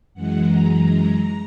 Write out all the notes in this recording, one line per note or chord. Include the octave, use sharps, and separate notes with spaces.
F#2 E3 G#3 F#5
A#5